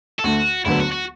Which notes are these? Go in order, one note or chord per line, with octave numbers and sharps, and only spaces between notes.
A4
D2 D3 A3 F#4
E1 D2 D3 F#3 B3 E4
F#4
F#4